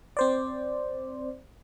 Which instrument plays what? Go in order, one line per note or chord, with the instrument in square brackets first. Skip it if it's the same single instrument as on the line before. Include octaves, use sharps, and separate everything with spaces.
[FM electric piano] C4 C5 D5